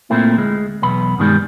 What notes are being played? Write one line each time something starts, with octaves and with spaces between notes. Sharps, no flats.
A#2 A3 A#3 C4 E4
D2 G#3
B1 E2 B3 B5
G2 B2 D#3 G3 G#3